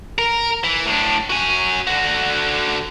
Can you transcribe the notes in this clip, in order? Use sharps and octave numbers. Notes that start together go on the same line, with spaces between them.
A#4
E3
A2 D4
F#4 G#5
D3 F#4